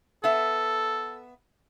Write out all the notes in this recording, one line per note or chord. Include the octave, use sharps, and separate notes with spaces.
B3 A4 E5